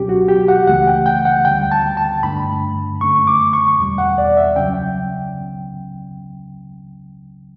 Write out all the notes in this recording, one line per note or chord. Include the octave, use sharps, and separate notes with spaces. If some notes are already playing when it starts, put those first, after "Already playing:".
Already playing: C#2 B2 F#3 C#4 G4
F#4
G4
F#5
C#2 C#3 E3 A3 C#4 F#5
G5
G5
F#5
D2 D3 G3 G5
A5
A5
G2 D3 A3 D4 B5
F#2 D3 A3 C#4 C#6
D6
C#6
E2 B2 G3
F#5
D5
E5
C#2 C#3 F#3 C#4 G5